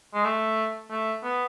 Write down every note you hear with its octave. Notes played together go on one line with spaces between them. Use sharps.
G#3
A3
A3
B3